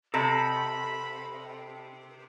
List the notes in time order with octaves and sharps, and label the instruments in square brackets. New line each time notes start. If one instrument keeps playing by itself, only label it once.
[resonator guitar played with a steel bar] C3 [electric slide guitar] A4 D#5 A5 [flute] B5